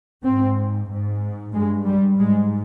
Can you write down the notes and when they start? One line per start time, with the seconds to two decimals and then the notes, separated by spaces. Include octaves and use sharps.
0.23 G#2 C4
0.89 G#2
1.54 G2 G#3
1.87 G3
2.18 G#2 G#3